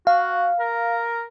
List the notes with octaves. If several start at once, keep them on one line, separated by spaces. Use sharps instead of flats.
F#4 F5
A#4